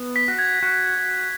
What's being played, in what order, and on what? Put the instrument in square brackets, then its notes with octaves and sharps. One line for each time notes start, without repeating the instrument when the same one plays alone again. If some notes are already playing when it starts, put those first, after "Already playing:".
Already playing: [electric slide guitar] B3
[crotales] B6
[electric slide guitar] F#4
[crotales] G#6
[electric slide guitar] F#4